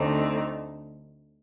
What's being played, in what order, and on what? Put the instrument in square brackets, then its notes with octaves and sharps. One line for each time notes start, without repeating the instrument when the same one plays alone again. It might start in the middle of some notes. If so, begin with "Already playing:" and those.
Already playing: [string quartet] D2 D3 A3 C4 D#4